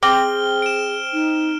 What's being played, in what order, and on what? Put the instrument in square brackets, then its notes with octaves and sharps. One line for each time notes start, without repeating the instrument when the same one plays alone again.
[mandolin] C4 [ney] G#4 [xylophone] D6 [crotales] F6 G7
[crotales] D7 E7
[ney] D#4